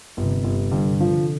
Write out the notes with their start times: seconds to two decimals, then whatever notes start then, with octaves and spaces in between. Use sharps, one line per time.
0.17 G1
0.22 C3
0.31 D3
0.44 G1
0.71 G2 D3
0.93 D3
1.00 F3
1.14 D3